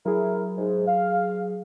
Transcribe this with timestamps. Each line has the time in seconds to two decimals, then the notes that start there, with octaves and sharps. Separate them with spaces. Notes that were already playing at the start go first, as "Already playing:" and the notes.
0.05 F#3 E4 G#4 A#4
0.58 G#2
0.87 F5